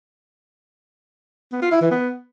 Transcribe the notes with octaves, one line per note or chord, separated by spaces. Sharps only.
B3
F4
E4
E3
B3